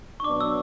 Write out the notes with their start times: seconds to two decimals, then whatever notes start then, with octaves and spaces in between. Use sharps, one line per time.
0.20 C#6
0.24 B2 F#3 B3 D4 D6
0.41 E6